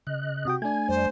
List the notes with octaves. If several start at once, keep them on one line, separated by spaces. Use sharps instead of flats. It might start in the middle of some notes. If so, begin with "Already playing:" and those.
C#3 D#5 F#6
C3 F#4 G5 D#6
A3 D4 G#5 G#6
F2 G3 C5 D5